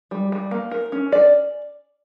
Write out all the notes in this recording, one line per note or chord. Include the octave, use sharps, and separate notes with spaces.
G3
G3
A#3
A#4
C#4
D5